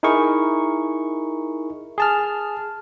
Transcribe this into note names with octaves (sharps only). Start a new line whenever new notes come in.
D#4 E4 G#4 A#4 C#6
G#4 A5 F6